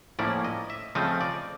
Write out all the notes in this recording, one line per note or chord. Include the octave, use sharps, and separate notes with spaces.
A2 F3 A#3 C#4 E4 D5
D#5
E5
C#3 F3 A3 C4 D#5
D5